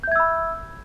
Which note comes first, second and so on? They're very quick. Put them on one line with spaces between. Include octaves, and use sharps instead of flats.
G6 E5 G#6 E6 B5